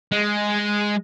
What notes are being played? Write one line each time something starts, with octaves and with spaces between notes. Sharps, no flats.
G#3